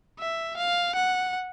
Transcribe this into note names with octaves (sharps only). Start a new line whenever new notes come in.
E5
F5
F#5